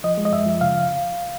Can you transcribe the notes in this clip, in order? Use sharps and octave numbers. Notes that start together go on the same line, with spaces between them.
F3 D#5
G#3
D#5
F#2 E5
F3
C#3 F5